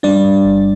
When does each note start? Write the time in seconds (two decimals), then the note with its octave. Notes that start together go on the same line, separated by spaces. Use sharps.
0.03 G3 D4 D5
0.24 G2
0.45 G1